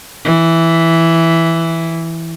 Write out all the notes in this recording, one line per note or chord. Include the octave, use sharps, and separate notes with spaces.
E3